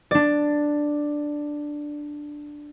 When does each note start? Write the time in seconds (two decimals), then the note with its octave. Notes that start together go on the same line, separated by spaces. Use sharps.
0.11 D4 D5